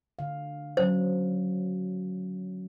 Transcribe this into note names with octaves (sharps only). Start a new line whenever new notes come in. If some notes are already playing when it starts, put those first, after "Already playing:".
D3 F5
F#3 C#4 C5